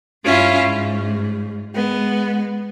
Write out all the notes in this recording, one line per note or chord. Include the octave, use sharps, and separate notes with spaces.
G2 C#4 E4 F4
G#2
G#3 B3